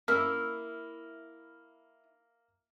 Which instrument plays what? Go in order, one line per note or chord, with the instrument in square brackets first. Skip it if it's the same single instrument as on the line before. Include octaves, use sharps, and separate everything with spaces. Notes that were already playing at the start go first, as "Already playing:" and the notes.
[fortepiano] A#3 [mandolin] E4 [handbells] F6